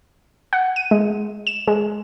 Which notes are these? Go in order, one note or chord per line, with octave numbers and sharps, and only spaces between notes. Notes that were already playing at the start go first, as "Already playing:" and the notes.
F#5
D#7
G#3
E7
G#3